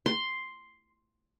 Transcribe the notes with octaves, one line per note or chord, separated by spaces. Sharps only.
C6